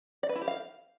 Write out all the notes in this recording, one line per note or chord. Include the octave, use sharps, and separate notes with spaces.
D5
B4
E4
G4
F5